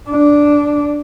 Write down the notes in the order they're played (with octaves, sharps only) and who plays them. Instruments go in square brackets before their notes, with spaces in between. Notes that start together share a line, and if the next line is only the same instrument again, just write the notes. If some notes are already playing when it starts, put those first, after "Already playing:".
[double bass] D4